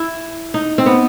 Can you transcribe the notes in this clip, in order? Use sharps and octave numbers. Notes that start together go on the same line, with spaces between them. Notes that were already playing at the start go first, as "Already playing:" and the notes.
Already playing: E4
D#4
C4
B3